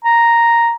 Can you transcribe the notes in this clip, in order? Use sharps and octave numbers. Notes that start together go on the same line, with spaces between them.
A#5